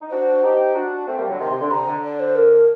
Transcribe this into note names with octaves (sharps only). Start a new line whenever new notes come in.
D#4
D4 F#4 C5
F#4
D#4 G4
D4 F#4
A3 C4
G3 A#3
D3 F#3
C3 D#3 C6
C3
D3
C3 A#5
D3
D5
C5
A#4